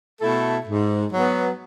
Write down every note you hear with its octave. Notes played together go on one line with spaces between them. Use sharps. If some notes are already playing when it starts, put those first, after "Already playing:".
B2 A3 E4 A4
G#2
F#3 B3